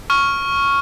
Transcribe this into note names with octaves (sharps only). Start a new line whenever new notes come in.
C#6 F6